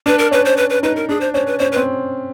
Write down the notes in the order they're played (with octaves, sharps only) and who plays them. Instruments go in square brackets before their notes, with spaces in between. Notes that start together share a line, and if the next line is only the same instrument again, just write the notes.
[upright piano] D4 [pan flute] B4
[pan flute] A#4
[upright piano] C#4 [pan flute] B4
[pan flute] C5
B4
B4
[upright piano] D#4 [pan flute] B4
[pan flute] A#4
[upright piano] D4 [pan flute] G#4
[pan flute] C5
[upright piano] C#4 [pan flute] C5
[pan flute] B4
[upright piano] C#4 [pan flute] C5
[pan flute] B4
[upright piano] C4